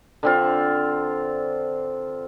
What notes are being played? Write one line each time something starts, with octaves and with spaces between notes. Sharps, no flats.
D3 C4 F4